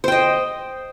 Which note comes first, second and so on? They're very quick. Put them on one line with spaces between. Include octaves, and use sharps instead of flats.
C5 G5 D#5